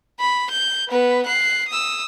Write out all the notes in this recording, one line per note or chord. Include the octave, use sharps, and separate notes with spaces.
B5
G6
B3 B4
F#6 C7
D#6 E6